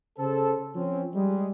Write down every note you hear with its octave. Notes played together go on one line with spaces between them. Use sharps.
C#3 A4 C5
F3 C4 C#4
G3 G#3